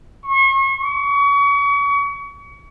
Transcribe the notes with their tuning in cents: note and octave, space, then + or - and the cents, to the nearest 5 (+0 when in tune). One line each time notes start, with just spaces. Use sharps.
C#6 -40
C#6 +35